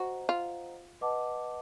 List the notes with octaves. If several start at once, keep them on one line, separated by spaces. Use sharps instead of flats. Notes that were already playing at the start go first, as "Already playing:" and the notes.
Already playing: F#4 C5 D#5 F#5 A#5
F4
B4 D#5 F#5 A5 D6